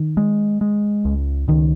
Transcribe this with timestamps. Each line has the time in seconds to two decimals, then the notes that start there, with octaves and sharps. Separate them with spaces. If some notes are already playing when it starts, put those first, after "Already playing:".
Already playing: D#3
0.17 G#3
0.61 G#3
1.05 C#2
1.48 C#2 D#3